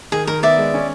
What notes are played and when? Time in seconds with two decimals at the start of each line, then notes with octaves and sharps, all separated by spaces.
0.12 D#3 G#4
0.27 D#3 A#4
0.43 B3 D5 E5
0.58 G#3
0.74 C#4